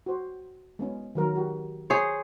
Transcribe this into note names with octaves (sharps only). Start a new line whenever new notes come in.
F#4 C5
G#3 B3 C#4
D#3 F#3 A#4
F#4 G4
G#4 C5 C#5